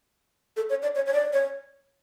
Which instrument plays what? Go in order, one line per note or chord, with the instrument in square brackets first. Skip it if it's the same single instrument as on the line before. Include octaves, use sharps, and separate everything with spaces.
[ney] A4
C#5
D5
C#5
C#5
D5
C#5